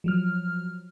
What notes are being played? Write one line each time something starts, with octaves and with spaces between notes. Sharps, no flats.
F3 F#3 F6